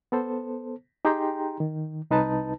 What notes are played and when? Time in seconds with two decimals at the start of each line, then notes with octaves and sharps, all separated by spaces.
0.12 B3 A4 C5
1.05 D#4 G4 G#4 G5 A#5 C6
1.60 D#3
2.10 C2 D#4 B4 A5